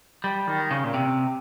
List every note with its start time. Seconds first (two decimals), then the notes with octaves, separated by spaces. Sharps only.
0.24 G3
0.47 D#3
0.71 C#3
0.84 A#2
0.94 C3